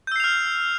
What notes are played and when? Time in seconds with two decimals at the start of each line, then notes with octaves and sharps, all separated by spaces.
0.07 G6
0.12 E6
0.16 C7
0.20 F7
0.24 F6